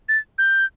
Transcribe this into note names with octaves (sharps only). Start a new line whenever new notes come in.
A6
G6